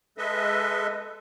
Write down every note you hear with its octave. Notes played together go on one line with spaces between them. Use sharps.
G#3 A4 B4 D#5 E5